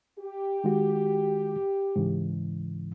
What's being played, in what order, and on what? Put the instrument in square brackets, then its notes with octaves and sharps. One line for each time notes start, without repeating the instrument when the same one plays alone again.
[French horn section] G4
[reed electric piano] D#3 G#3 F#4
G#2 C#3 E3